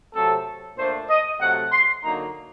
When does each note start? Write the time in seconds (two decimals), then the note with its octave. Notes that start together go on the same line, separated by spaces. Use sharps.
0.15 C3 F#3 A3 C4 A4
0.78 A#2 A3 D4 C5
1.09 D#5
1.40 C3 F#3 A3 F#5
1.72 C6
2.04 D3 F#3 A#3 D#4 A#5